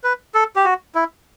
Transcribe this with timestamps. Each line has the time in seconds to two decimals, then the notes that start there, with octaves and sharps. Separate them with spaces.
0.04 B4
0.35 A4
0.56 G4
0.65 F#4
0.95 E4